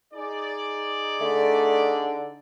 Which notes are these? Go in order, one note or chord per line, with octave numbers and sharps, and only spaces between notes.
D#4 G#4 D5
D3 A3